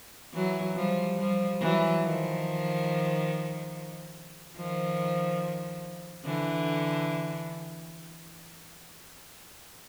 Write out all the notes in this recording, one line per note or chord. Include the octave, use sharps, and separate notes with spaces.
E3 F#3
F3 G3
F3 G3
E3 F#3
D#3 F3
D#3 F3
D3 E3